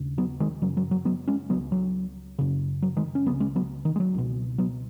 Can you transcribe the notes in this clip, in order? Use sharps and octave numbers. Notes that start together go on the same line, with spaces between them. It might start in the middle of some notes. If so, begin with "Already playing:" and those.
Already playing: D#2 C#3
F#3 B3
D#3 G#3
F#2 C#3 F#3
F#3
F#3
F#3 B3
G#3 C#4
C#2 C#3 F#3 B3
F#3
F#2 C#3
F#3
D#3 G#3
C#4
C#2 C#3 F#3 B3
G#3 C#4
F#3 B3
D#3
G#3
F#3
C#2 B2
F#3 B3